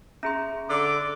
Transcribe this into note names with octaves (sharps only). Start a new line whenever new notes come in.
C#4 G#4 E5 A#5 C6
D3 D6